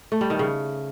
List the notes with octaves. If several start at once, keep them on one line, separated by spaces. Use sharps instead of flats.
A3
G3
D#3
C#3